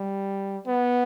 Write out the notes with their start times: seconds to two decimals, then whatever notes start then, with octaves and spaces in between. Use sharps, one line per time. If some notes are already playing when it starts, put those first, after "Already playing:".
Already playing: G3
0.66 B3